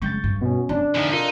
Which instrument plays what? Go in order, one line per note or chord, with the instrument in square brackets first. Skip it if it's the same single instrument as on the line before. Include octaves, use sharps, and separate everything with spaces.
[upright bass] C#3 G#3 [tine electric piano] C#6 G6 A6
[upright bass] G2
[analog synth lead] B2 [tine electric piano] B3 C#4
[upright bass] C3 [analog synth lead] D4
[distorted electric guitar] E2 F3 [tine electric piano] D3 D#4
[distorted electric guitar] D#4 [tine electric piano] F4 A4 A#4